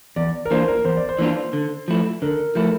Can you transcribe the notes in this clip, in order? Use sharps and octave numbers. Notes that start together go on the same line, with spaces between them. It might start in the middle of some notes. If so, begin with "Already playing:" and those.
E2 D5
A#4
E3 A#3 D4 F4 C5
A#4
E2 C5
D5
C5
E3 A#3 D4 F4
D3
F3 A3 E4
D3 A#4
F3 A3 E4